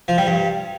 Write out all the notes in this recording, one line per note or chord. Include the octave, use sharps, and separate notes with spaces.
F3
G3
G2